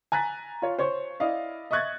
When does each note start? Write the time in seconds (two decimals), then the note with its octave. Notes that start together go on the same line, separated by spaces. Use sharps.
0.12 G#5 A#5 F#6 A6 B6
0.62 F4 C#5
0.79 C5 C#5 C#6
1.20 E4 D5 D#5 F5
1.71 D#5 E5 C#6 F#6 G#6 A6